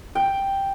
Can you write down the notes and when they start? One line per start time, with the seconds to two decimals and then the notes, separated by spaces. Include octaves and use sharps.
0.15 G5